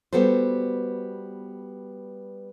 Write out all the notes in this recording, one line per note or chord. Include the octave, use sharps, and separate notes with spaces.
G3 B3 F#4 A4 C5